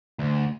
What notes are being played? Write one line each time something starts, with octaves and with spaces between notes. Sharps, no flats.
D2